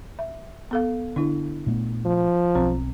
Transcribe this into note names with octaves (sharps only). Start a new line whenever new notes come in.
E5
B3 A4 F5
D3 D4 E4
A#2 A3 B3
F3
B1 C4